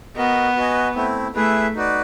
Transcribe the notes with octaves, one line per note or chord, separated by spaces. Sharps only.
B3 F#4 A#4 D#5
F#4 B4 D#5 G#5
A3 C4 E4
A3 E4 G#4 B4 E5
D#4 F#4 B4 D5